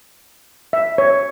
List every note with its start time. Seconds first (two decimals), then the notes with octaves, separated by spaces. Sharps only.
0.73 E5
0.98 C#5